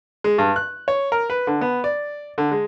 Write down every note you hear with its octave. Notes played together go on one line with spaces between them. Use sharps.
G#3
G2
F#6
C#5
A#4
B4
D3
B3
D5
D3
G#3